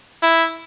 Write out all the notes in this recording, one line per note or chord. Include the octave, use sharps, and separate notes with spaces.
E4